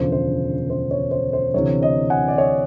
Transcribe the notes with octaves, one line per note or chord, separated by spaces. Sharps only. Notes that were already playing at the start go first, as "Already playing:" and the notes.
Already playing: E1 D2 C#3 F3 C5
C5
C5
C#5
C5
C5
D2 C3 E3 C#5
C#5 D#5
F#5 G#5
D5
C#5 D#5